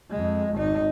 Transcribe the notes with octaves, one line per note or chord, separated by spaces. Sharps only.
F2 G#3
G#1 D#4